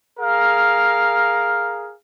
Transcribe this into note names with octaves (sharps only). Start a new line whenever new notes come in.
G#4 A#4 F5